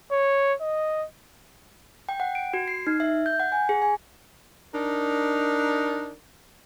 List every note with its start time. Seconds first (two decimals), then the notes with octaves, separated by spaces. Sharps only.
0.11 C#5
0.61 D#5
2.09 G5
2.20 F#5
2.35 D7
2.54 F#4
2.68 C7
2.87 D#4
3.00 E5
3.26 G6
3.40 F#5
3.52 G#5
3.69 G#4
3.82 G#5
4.73 D4 D#4 A#4